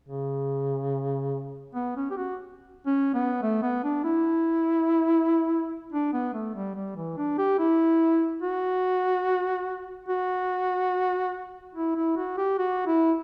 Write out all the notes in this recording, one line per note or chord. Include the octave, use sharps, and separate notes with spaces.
C#3
B3
C#4
G4
F#4
C#4
B3
A3
B3
D4
E4
D4
B3
A3
G3
G3
E3
D4
G4
E4
F#4
F#4
E4
E4
F#4
G4
F#4
E4